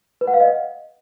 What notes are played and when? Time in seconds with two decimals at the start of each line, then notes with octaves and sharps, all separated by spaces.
0.21 B4
0.27 F#5
0.34 F5
0.40 D#5